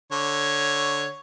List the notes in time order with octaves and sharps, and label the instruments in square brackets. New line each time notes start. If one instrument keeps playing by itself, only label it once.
[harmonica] D3 C#5